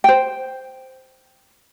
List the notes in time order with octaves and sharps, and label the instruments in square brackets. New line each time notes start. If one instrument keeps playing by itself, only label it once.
[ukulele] C5 G5